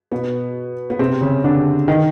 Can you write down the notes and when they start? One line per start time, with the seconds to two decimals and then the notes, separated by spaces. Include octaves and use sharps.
0.11 B2 B3
0.90 B3
0.99 C3 C4
1.21 C#3 C#4
1.44 D3 D4
1.88 D#3 D#4